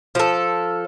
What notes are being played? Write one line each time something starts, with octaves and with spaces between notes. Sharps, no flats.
F3 A4